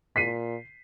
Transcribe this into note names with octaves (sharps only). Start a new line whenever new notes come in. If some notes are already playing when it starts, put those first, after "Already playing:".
A#2 B6 C7 D#7